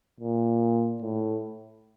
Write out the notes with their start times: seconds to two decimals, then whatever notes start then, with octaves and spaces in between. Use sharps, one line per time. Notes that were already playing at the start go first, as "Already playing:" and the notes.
0.20 A#2
1.02 A2